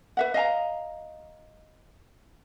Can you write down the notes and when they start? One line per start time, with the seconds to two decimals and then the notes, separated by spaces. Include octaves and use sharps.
0.17 B4 E5 F#5
0.34 D#5 F5 G#5 A#5